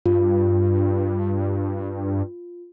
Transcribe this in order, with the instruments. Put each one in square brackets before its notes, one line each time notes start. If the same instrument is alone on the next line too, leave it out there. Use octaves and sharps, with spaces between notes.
[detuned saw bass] G2 [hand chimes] F4